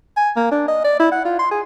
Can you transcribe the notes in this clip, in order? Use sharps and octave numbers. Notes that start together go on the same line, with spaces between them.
G#5
A#3
D4
D#5
D5
E4
F#5
F4
C6
G#4